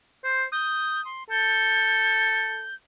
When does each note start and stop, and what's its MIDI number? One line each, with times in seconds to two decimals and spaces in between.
0.24 0.44 72
0.52 1.03 87
0.52 1.04 91
1.05 1.24 84
1.30 2.67 69
1.30 2.75 91